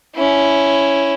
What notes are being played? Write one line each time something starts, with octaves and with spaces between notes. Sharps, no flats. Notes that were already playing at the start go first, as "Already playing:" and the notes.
C#4 E4